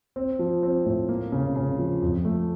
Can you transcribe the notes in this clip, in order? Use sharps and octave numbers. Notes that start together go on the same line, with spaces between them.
C4
F3
C4
A2
A#3
C#3
C#3
F3
F2
A3